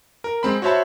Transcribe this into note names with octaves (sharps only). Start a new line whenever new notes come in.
A#4
G#3 C4 B5
F#4 C5 C#5 E5 A5 B5